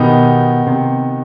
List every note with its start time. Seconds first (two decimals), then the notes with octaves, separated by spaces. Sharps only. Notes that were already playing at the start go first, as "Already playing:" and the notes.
Already playing: B2 D#3 B3 D#4 G4
0.67 C3